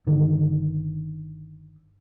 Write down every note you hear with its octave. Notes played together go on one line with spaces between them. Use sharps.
G1 D3 D#3